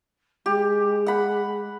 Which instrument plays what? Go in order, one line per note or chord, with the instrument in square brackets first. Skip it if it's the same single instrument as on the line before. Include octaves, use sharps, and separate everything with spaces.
[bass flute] G#3 [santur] G4
[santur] F#5 B5